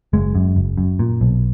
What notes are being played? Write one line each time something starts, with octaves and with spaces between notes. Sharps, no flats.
F#1 G#3
F#2
F#1
F#2
A#2
B1